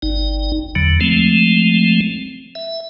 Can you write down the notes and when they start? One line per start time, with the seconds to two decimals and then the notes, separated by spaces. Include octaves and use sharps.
0.02 G1 D#4
0.75 E2 D3 F#3
1.01 F3 G#3 A3 C4
2.55 E5